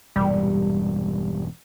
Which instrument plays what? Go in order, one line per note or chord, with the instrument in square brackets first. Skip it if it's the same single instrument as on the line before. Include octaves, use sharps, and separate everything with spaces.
[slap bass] E1 G2 A#2 [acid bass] G3